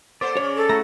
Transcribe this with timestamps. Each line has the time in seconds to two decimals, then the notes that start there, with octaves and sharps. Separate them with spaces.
0.21 A#3 A4 C5 D5
0.37 C#3 C#4 C#5
0.56 A4
0.69 A3 E4 F#4 A#5